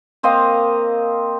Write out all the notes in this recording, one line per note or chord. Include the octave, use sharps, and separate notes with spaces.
A#3 C4 D#5 F5